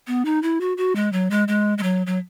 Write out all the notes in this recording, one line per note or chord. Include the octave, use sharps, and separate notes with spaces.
B3
D#4
E4
F#4
F#4
G#3
F#3
G#3
G#3
G#3
F#3
F#3